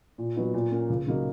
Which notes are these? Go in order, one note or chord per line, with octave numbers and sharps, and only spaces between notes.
A#2
F#3 B3 D#4
A#2
A#3 C#4
C#2
C#3 F#3 A#3 D#4